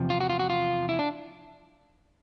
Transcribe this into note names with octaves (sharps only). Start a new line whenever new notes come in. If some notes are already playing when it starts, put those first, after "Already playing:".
Already playing: E2 C3 F3
F4
F#4
F4
F#4
F4
E4
D4